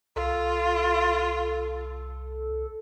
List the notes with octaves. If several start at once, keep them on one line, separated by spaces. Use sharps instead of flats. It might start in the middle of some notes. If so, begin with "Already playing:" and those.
C2 F4 A4